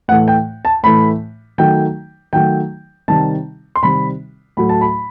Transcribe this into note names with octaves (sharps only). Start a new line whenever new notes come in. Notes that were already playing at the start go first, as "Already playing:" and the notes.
A2 E3 A3 F#5
G5
A5
A2 E3 A3 B5
D#3 F#3 A3 G5
D#3 F#3 A3 G5
C3 D#3 G3 A5
C6
C3 D#3 G3 B5
A2 F#3 A3 B5
A5
B5